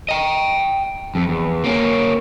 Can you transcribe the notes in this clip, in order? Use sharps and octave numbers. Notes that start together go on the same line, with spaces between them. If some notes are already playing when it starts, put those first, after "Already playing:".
D#5 G5
F2
E2
A#3 C#4